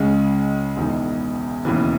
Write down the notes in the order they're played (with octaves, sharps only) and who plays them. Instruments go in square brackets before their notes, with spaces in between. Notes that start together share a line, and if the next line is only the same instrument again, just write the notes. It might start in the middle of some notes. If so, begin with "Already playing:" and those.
Already playing: [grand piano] C#2 C#3 G#3
E1 E2 D#3 G#3
E1 D#2 C#3 E3